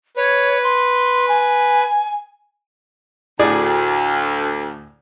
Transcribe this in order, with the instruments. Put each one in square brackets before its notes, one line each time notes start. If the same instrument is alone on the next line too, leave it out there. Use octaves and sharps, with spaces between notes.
[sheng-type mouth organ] B4 [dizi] C#5
[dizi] C6
G#5
[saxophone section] D2 [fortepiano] A2 G#4 D5